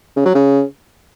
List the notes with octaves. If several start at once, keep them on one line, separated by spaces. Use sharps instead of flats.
C#3
F#3
C#3